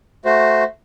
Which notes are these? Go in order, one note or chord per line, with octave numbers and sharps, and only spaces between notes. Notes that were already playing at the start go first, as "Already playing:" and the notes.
A3 F#4 C5